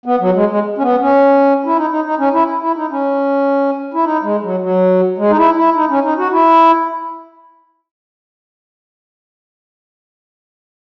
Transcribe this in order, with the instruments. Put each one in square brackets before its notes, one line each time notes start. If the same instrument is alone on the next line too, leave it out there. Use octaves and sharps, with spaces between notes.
[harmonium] B3
F#3
G#3
G#3
C#4
B3
C#4
E4
D#4
D#4
D#4
C#4
E4
E4
D#4
C#4
E4
D#4
G#3
F#3
F#3
G#3
D#4
E4
E4
D#4
C#4
D#4
F#4
E4